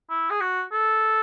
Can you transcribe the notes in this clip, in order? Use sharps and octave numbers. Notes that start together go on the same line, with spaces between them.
E4
G#4
F#4
A4